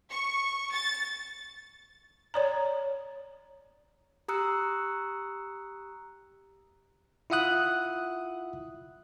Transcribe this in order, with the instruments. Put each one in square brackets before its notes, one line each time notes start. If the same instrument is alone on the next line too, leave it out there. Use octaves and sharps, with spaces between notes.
[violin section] C#6
A6
[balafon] C#5 D5 A#5
[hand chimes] G4 A#5 D#6 E6 F#6 C#7
[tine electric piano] E4 F4 E5 F#5 D#6 F#6